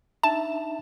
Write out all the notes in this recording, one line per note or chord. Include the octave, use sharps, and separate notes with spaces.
D4 D#4 E5 A5